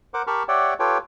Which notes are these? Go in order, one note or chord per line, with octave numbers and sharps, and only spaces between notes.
A#4 C5 F#5 D6
G4 A#4 A5 B5 C#6 F6
G4 C#5 D5 E5 F#5 G5
F4 G4 A4 B4 C#5 G5